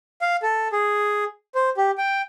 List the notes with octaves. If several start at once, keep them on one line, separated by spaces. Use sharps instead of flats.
F5
A4
G#4
C5
G4
G5